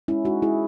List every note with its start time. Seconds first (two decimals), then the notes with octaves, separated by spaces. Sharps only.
0.08 G#3 C#4 E4
0.25 G#3 D#4 F#4
0.42 G#3 E4 G#4